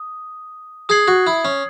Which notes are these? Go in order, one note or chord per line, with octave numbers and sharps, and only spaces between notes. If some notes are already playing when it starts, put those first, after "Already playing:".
Already playing: D#6
G#4 D#6 G#6 C7 F#7
F#4
E4
C#4